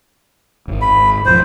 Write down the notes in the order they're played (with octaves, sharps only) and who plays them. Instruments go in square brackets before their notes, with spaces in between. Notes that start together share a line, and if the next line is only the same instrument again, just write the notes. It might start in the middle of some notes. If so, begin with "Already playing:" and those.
[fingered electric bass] D1 G#1
[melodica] B5
[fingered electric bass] E1 F3 [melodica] C5